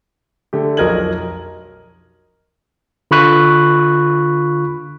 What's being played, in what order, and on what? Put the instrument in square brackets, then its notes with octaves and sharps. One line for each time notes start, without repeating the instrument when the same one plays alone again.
[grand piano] D3 A3 G4
B1 F2 A#4 D#5 G#6 F#7
[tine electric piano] D3 F4 B5 C#6 F#6 B6